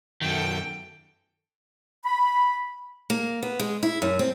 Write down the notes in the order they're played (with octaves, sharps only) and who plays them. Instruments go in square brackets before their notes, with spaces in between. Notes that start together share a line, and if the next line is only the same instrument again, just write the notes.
[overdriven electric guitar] F#2 D#3 [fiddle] A4 G5
[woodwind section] B5
[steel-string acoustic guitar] A#3
B3
G#3
E4
F#2
C4